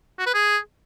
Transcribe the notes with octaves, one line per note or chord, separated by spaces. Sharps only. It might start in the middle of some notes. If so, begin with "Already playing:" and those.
F#4
B4
G#4